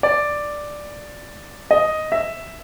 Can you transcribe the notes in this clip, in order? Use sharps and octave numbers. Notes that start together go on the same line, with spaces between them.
D5
D#5
E5